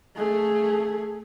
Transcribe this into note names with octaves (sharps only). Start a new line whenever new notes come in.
A3 G#4